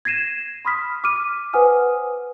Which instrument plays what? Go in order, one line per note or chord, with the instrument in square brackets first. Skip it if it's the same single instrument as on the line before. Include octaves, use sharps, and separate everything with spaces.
[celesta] G#6 A#6 C7 D#7 E7
B5 C6 D#6 F6 B6
D6 F6 D#7
B4 C5 F#5 G#5 D#6 F6